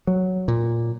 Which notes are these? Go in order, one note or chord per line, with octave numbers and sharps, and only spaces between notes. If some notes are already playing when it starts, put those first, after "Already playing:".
F#3
A#2